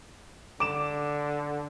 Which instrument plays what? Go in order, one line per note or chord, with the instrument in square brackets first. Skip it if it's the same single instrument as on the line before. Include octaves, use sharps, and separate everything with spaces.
[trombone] D3 [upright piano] D6 E7